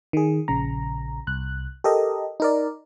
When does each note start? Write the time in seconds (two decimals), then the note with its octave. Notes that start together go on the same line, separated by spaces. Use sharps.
0.13 D#3 G#4
0.48 A#1 C#3 A#5
1.27 C2 F#6
1.84 G4 A4 A#4 D#5
2.40 D#4 A#4 D5